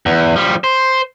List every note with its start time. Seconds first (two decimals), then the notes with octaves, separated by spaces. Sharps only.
0.06 E2
0.36 F3 G3
0.64 C5